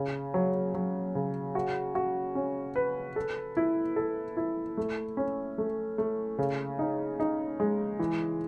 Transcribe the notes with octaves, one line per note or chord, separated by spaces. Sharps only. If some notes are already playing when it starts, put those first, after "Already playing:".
Already playing: C#3
F#3
F#3
C#3
F#4
F#4
C#4
B4
A4
E4
A4
E4
A3
C#4
A3
A3
C#3
D#4
D#4
G#3
E3